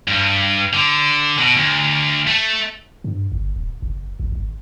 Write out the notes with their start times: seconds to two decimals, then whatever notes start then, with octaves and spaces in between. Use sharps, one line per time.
0.08 G2
0.73 D3
1.38 B2
1.55 D2
2.27 A3
3.04 G2
3.32 G1
3.56 D1
3.82 F#1
4.20 G#1
4.32 G#1